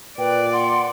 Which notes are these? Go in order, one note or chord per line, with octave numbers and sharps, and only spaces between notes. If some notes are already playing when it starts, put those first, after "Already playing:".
A#2 B4 D5 G5
F#5 C6